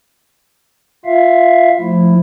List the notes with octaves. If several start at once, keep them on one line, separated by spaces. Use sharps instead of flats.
F4 E5 F5
F3 A3 E4